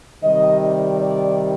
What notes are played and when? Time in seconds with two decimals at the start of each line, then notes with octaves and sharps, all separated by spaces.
0.23 C3 D#3 G3 D#5
0.63 D5
1.02 D5